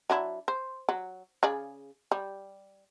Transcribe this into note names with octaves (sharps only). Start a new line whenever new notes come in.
F#3 D4 E4
C5
F#3
C#3 G#4 D5
G3